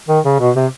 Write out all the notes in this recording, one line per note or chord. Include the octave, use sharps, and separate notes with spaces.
D#3
C#3
B2
C3